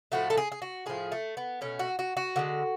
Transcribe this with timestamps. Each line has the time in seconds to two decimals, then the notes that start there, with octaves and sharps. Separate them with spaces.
0.12 A2 F3 A3 F#4
0.30 A4
0.37 G#4
0.52 G#4
0.62 F#4
0.86 A2 F3 A3 G#4
1.12 A3
1.37 B3
1.61 B2 A3 C#4
1.79 F#4
1.99 F#4
2.17 F#4
2.36 D3 F3 G#3